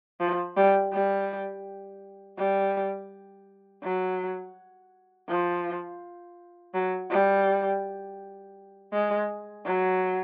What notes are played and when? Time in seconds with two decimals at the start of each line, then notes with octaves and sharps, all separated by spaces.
0.20 F3
0.56 G3
0.92 G3
2.37 G3
3.83 F#3
5.28 F3
6.74 F#3
7.10 G3
8.92 G#3
9.65 F#3